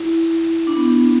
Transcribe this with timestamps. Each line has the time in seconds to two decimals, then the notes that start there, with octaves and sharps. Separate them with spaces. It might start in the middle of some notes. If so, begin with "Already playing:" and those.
Already playing: E4
0.67 D4
0.77 B3
0.86 D4